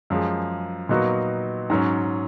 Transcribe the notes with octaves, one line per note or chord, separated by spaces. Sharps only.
F#2 F3 G#3
A#2 F#3 B3 D#4 F#4
G#2 F#3 C#4